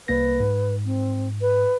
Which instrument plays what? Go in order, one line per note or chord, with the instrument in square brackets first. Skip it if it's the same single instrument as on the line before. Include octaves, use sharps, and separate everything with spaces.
[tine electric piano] C2 A#3 A#6 [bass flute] B4
[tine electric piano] G#2
[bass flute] C4
B4